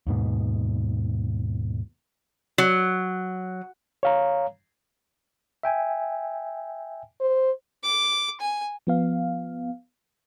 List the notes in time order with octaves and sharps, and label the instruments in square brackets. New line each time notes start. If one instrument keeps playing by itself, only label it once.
[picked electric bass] D#2 G#2 B2
[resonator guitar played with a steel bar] F#3
[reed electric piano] C#5 F5 A#5
[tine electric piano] E5 G5 G#5
[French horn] C5
[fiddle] D6
G#5
[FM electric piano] F3 B3 F5